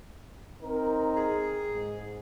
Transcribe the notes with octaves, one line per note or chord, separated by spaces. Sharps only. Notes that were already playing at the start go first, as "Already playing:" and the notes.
C4 D#4 A#4
G#4
G#2